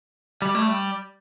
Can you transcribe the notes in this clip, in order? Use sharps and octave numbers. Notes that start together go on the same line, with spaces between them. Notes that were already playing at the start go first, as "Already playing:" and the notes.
G3
A3
G3